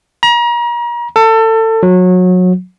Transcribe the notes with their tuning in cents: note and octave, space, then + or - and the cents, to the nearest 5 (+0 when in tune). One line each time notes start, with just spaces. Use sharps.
A#5 +35
A4 +25
F#3 -25